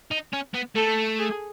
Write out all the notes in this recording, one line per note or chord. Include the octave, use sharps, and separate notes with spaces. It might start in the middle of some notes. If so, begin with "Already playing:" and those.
D#4
C#4
B3
A3 A4
G#4